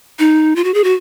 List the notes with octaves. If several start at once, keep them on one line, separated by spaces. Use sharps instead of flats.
D#4
F4
F#4
G#4
F#4